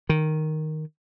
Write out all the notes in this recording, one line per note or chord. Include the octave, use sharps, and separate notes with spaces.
D#3